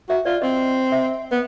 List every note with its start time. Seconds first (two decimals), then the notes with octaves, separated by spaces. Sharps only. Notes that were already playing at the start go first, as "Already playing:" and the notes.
0.09 F#4 E5
0.25 F4 D5
0.42 C4 D#5
0.92 E5
1.31 B3